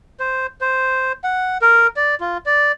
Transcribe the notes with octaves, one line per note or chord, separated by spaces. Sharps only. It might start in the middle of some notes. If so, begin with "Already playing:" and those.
C5
C5
F#5
A#4
D5
F4
D5